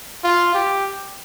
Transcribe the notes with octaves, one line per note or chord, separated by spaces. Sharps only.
F4
G4